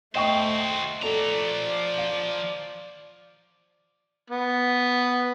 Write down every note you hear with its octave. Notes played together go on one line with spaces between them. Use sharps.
A3 F#4 C5 D#5 G5 C#6
F3 A4 D5 A#5
F5
B3